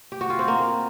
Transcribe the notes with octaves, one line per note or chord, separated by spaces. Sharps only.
G4
F#4
F4
C4
A#3